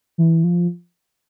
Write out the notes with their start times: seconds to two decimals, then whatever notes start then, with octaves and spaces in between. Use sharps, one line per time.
0.18 E3
0.44 F3